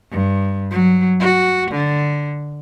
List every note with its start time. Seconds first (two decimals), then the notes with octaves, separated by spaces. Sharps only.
0.11 G2
0.71 F#3
1.20 F#4
1.71 D3